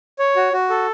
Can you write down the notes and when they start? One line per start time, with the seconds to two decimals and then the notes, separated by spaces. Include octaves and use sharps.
0.19 C#5
0.36 F#4
0.53 F#4
0.70 A4